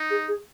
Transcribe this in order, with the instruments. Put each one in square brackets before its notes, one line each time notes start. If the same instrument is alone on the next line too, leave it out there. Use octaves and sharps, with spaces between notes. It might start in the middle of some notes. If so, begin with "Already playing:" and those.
Already playing: [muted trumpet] D#4
[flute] G#4
G#4